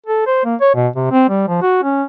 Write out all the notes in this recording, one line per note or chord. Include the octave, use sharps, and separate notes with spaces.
A4
C5
A#3
C#5
B2
C3
C4
G3
F3
F#4
C#4